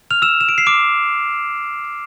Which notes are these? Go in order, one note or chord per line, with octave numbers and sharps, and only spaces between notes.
F6 F7
E6 E7
E7
D7
C7
D6 D7